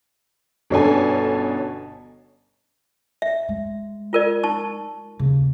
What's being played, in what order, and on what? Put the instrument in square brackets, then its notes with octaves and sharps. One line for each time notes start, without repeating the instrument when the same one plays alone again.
[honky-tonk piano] G1 B2 C#4 D4 A4 G#5
[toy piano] E5
[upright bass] G#3
[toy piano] F4 A#4 D5
D#4 A5 C#6
[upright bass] D#2 C#3